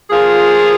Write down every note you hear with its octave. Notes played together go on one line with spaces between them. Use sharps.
F3 A#3 F4 G#4